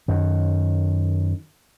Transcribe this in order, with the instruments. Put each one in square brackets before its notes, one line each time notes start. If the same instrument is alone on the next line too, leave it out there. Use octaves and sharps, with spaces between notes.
[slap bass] F#2 D#3